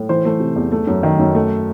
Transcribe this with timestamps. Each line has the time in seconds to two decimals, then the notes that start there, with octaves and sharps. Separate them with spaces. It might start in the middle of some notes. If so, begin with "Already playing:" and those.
Already playing: A2
0.09 E3 C5
0.25 A3
0.40 C3
0.56 E2
0.72 A3
0.87 F#2
1.03 D#3
1.19 F#2
1.35 A3